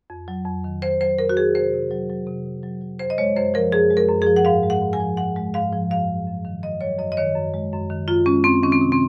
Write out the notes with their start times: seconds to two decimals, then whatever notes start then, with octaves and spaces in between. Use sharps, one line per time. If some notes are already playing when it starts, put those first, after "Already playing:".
0.10 F2
0.28 F#3
0.45 F2
0.64 D#3
0.82 F2 C5
1.01 F#3 C5
1.19 F2 A#4
1.29 F#4
1.36 D#3 G#4
1.55 C3 C5
1.73 C3
1.91 F#3
2.10 F#3
2.27 C3
2.46 C3
2.63 F#3
2.82 F#3
2.99 F#2 C5
3.10 D#5
3.18 G#3 C#5
3.36 F#2 C5
3.54 F3 A#4
3.72 F#2 G#4
3.90 G#3
3.97 A#4
4.09 F#2
4.22 F3 G#4
4.36 F#5
4.45 G#2 F5
4.63 G#3
4.70 F#5
4.82 G#2
4.93 G#5
5.00 F3
5.17 G#2 F#5
5.36 G#3
5.54 G#2 F5
5.73 F3
5.90 F#2 F5
6.08 F#3
6.27 F#2
6.45 D#3
6.62 F#2 D#5
6.81 F#3 C#5
6.99 F#2 D#5
7.12 D#5
7.17 D#3 C#5
7.35 F#2
7.54 G#3
7.73 F#2
7.90 D#3
8.08 F#2 F4
8.26 G#3 C#4
8.44 F#2 C4
8.63 D#3 C#4
8.72 C4
8.81 C3
8.92 C4